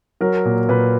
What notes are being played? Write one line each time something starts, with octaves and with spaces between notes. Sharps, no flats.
F#3 A#4
A#2
A#2 B4